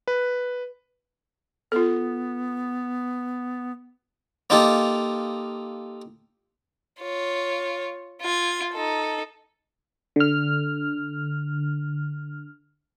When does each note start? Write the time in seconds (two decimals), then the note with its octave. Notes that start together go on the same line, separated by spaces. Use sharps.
0.08 B4
1.72 B3 F4 A4
4.50 A#3 D#4 F4 G4 A4
7.01 F4 C#5
8.22 F4 G#6
8.73 D#4 A4
10.16 D3 F6